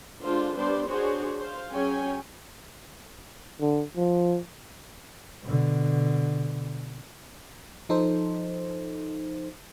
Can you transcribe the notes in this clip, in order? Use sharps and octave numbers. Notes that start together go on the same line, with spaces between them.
D3 G#3 D4 F4 C5
G3 B3 D4 C5 D5
D4 F#4 G#4 C5 C#5
C5 F5
F#3 C#4 G#4 C#5 G5 G#5
D3
F3
B2 D3
F3 D#4 A4 C5